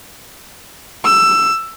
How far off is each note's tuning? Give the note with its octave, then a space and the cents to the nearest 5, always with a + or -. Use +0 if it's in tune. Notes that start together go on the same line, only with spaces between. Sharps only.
E6 +15